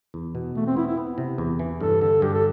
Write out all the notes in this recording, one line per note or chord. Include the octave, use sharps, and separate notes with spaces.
E2
B2
E2 A3
C4
B3 E4
E4
B3
C3
E2
E3
G2 A4
D3 A4
G2 G4
A4